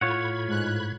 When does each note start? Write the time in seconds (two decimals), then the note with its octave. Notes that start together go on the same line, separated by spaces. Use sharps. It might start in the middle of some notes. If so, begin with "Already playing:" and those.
0.01 A2 F4 C#5 F#5 B5 G#6
0.47 G#2 F#6